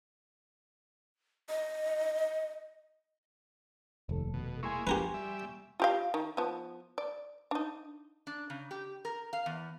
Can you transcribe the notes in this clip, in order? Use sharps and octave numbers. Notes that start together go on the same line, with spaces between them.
D#5
F1 D#2 A4
B2
G#3 A#3 E4 G#5 C6 C#6
F3 G4 A#4 B4
G3 E5
F4 G4 F5
D#3
F3 B3
D5
D4 D#4
D4
C#3
G4
A#4
F5
E2